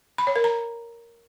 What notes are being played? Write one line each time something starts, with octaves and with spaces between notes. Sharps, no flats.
B5
C#5
A#4
A#5